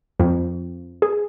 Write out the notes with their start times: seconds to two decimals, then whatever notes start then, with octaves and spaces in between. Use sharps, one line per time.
0.20 F2
1.02 G#4